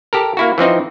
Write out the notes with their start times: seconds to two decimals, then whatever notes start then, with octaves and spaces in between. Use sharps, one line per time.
0.13 G4 A4 A#4
0.37 A#3 E4 F#4
0.58 E3 F3 C4 D#4